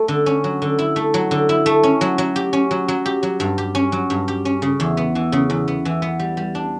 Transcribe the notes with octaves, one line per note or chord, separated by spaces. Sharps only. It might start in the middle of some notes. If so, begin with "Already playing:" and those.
Already playing: A3
D3
C#4
F#3
D3
E4
A3
F#3
D3
E4
A3
C#4
F#3
F#3
G4
C#4
F#3
F#3
G4
F#3
G2
G4
C#4
F#3
G2
G4
C#4
C#3
E2
B3
E3
C#3
E2
B3
E3
B3
G3
G3
D4